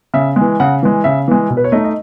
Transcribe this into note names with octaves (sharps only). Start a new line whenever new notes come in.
C#3 E5
G#3
E3
C#3 F#5
E3 G#3
C#3 E5
E3 G#3
B2
B4
C#5
A3 D#4 D#5
D#5